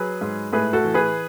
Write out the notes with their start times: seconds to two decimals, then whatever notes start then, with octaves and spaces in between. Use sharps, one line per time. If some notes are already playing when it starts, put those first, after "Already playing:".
Already playing: F#3 G#4 B4
0.21 G#2
0.53 A2 G#4 B4
0.73 F#4 A4
0.85 E3
0.94 G#4 B4